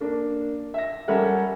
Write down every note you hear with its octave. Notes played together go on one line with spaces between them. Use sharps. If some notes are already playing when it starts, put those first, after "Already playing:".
A#3 D4
E5 A#6
G3 C#4 A4 A#4 E5 F#5